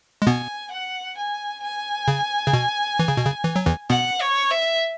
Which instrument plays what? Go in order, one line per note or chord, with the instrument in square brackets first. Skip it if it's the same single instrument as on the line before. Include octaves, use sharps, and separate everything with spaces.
[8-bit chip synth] G#3
[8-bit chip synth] B2 B3 [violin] G#5
[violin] F#5
G#5
G#5
[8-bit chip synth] C#3
C#3
B2
E3
C#3
B2
C#3
E3
F#3
E2 E3
[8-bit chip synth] B2 B3 [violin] F#5
[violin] C#5
E5